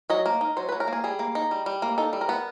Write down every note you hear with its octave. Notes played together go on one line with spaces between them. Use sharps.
F#3 D#5
A#3
D#4
F#3 C5
F#3 B4
A#4
A#3 G#4
G3 G#4
A#3
D#4
G3
G3
A#3
D#4 A4
G3
A#4
B3